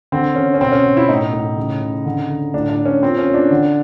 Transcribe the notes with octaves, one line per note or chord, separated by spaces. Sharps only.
D3 C4
D3 C#4
C#4
B2 C4
C#4
B2
E4
A2 D#4
A2
C#3
C#3
D3
D3
A2 D4
D4
A2
C#4
A#2 C4
C#4
A#2
D4
D3